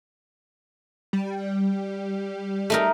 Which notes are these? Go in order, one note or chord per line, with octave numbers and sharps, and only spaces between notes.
G3
A3 D#4 A#4